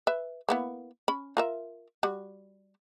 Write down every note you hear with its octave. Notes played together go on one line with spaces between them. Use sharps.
B4 E5
A#3 B3 E4
C#4 B5
F4 A#4 E5
G3 F#4